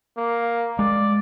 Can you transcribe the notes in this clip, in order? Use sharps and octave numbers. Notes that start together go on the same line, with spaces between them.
A#3
G#3 D5